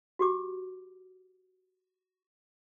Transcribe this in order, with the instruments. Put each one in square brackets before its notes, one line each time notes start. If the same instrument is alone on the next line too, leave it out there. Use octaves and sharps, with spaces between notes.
[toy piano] F#4 G4 D6